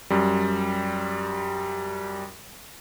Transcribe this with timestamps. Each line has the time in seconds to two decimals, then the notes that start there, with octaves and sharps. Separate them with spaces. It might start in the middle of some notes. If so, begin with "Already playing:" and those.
0.10 F#2 G3